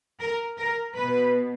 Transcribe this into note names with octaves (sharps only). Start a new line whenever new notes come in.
A#4
A#4
B2 B4